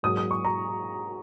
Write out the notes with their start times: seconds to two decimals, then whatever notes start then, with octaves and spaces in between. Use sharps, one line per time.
0.03 G#2 F#3 A#3 D#6
0.17 D#6
0.31 C#6
0.45 A#5